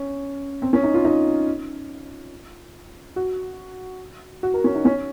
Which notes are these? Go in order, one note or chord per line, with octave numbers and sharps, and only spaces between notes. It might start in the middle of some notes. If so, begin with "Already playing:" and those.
Already playing: C#4
C4
C#4
D#4
F4
D#4
F#4
F#4
A#4
C#4
D#4
C#4